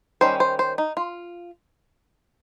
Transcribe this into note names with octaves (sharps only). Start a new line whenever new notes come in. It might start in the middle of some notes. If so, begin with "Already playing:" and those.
D#3 G3 C#4 C5
C5
C5
D#4
F4